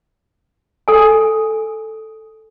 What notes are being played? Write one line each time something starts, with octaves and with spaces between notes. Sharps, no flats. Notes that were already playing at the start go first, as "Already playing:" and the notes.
A4 G#5